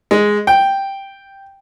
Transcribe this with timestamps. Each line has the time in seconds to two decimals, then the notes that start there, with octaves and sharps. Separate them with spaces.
0.11 G#3
0.47 G5